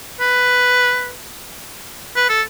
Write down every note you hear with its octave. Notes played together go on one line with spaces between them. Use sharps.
B4
B4
A4